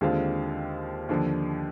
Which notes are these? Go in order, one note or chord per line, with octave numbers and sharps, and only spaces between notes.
D#2 D3 G#3 C4 F4
D#2 D3 F3